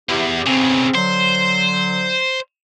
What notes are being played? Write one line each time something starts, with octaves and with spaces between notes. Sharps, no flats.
E2 E4 G4
B1 C#3 C4
D3 F#3 C5